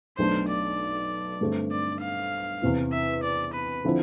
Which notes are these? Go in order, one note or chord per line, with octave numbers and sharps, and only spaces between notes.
B1 B2 A3 D4 C5
D5
G2 D3 A3 C4
D5
F5
E2 C3 E3
E5
D5
B4
D3 F3 C4 E4